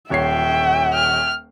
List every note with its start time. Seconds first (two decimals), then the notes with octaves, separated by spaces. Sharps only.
0.10 D#1 C#5 E5 G5 C7
0.94 F6